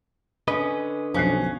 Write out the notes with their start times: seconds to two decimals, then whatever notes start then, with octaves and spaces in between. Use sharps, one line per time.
0.48 D3 C#4 B4 D#5
1.14 B1 F3 C#4 F#6 C7